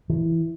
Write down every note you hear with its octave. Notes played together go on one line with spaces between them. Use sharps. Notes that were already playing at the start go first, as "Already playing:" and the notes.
E3